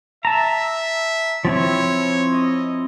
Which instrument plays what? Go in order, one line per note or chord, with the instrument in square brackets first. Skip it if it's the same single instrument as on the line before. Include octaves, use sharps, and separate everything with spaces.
[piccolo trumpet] E5 [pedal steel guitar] A5 A#5
[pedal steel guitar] F3 C4 E4 [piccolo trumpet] C#5
[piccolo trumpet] D#5